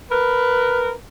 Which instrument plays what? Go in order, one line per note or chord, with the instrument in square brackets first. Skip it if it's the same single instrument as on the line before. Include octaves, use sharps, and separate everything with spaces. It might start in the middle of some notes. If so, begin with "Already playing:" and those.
[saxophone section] A#4 B4